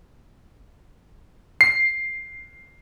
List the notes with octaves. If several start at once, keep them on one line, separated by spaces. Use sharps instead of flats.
C7